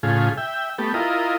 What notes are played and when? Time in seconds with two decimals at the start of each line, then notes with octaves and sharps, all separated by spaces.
0.03 A2 C#3 F4 G#4
0.38 E5 G5
0.78 A3 B3 G4
0.94 E4 F4 A#4 D#5